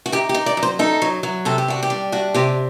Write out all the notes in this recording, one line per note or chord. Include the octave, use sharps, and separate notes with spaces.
F#4
D#4 G4
G4
D#4
D5
F#3
C5
D#4 A4
F#3
F#3
C3 A4
G4
D4 F#4
G4
G3
D4 F#4
C3 G4